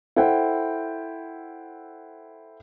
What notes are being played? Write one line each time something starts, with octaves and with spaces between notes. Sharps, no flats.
E4 A4 C5 F#5 G5